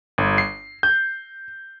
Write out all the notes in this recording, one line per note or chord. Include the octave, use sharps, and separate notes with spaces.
G1
C7
G6